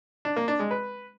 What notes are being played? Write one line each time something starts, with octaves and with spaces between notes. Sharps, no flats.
D4
A#3
D4
G#3
B4